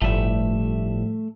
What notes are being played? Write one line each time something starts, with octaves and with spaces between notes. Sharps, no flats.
G1 A2 F3 G3 A3 E5